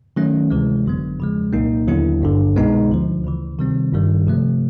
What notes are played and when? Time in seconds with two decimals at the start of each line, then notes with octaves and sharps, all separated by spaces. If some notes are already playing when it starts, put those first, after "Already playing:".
0.16 D#3 F#3 A3 C#4
0.50 D2 C3 E3 G#3
0.85 G#1 F#2 D3 F#3 B3
1.19 E2 C#3 F3 G#3
1.53 C2 A#2 F#3 A#3 D#4
1.87 D#2 D3 F#3 B3 E4
2.22 G#1 G2 D3
2.56 C2 B2 G#3 B3 D#4
2.91 D2 D3 F3
3.24 D2 C#3 E3
3.59 C3 D#3 G3 C4
3.92 G1 G2 D#3 G3
4.27 C3 F3 A3